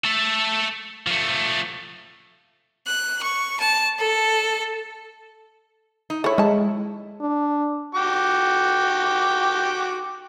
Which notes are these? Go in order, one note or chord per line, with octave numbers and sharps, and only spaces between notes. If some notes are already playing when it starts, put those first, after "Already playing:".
A3 A4
F3 A3
F#6
C#6
A5
A4
D#4
E4 A4 C#5
G#3 D#4 A5
D4
F#4 G5 D6